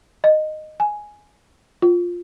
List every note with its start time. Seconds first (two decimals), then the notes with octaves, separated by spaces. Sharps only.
0.24 D#5
0.80 G#5
1.82 F4